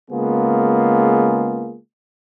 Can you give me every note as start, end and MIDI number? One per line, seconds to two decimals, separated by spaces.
0.11 1.77 49
0.11 1.77 56
0.11 1.77 58
0.11 1.77 59
0.11 1.77 65
0.11 1.77 68